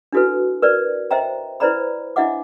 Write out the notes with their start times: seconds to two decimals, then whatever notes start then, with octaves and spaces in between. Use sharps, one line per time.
0.13 D4 E4 F#4 A4 B4
0.62 A#4 B4 D5
1.11 C5 D#5 E5 G5 A#5
1.60 E4 B4 C5 D5 A#5 B5
2.16 D4 E4 D#5 E5 F#5 D6